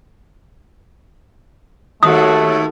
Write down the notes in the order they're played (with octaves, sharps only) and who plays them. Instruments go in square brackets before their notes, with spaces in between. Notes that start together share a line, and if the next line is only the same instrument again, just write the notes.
[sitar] D#2 [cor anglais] A3 [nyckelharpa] F#4 A4 [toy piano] D#6